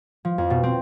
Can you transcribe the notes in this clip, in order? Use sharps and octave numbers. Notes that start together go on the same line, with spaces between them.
F3
F2
B2
C4